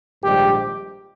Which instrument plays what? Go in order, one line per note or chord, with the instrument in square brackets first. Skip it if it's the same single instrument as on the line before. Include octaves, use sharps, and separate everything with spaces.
[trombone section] A#1 G#2 D#3 G3 G4